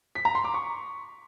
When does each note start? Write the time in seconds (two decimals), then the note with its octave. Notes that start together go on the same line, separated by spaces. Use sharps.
0.15 B6
0.25 A#5
0.35 C6
0.45 D6
0.54 C#6